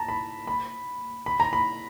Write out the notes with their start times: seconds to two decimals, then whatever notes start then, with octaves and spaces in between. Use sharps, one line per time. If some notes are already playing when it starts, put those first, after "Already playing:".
Already playing: A5 A#5
0.08 B5
0.47 B5
1.26 B5
1.40 A#5
1.53 B5